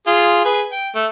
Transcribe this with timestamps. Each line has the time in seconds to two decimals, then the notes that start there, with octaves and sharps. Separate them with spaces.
0.07 F4 G#4
0.45 G#4 B4 G#5
0.72 G5
0.95 A3